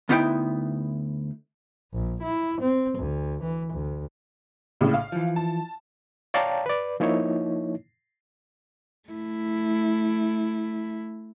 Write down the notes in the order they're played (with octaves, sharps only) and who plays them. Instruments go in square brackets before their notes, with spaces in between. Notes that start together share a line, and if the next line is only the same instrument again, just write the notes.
[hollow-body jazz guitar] D2 B3 D#4 E4 G5
[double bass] A#1
E4
C4
D2
E3
D2
[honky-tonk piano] A#1 A2 C#3
F5
[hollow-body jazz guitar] E3 F3
[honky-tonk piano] A5
[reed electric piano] C#5 D5 F5 G5 A5 A#5
B4 D5
F3 A#3 D#4 E4 C#5
[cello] A3 E4